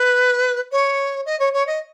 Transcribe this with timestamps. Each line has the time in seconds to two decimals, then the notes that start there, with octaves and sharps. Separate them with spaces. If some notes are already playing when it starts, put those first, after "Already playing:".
Already playing: B4
0.71 C#5
1.25 D#5
1.39 C#5
1.53 C#5
1.67 D#5